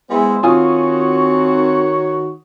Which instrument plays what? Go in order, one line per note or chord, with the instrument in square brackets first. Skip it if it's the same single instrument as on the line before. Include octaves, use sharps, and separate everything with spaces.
[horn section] G#3 B3 E4 [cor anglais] C5
[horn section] D#3 F#4 [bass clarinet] C4 [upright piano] F4 G#5 D#6 [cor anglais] C#5